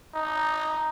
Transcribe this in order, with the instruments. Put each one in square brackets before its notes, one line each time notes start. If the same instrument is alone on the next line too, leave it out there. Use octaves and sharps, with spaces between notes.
[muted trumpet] D#4